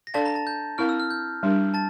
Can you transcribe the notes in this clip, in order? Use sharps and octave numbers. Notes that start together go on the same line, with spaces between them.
A#6
D4 A4 D5 F5 A5 A6
A#5 A#6
A5 A6
G6
C4 E4 A#4 F5 F6
E6
F6
G6
G3 D4 G4 A#4
A5 A6